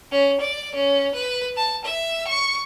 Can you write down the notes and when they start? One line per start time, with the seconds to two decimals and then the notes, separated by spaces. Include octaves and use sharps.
0.12 C#4
0.41 D5
0.76 C#4
1.15 B4
1.57 A5
1.85 E5
2.28 C#6